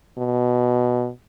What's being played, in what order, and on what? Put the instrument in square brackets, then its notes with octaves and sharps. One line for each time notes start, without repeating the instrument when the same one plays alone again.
[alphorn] B2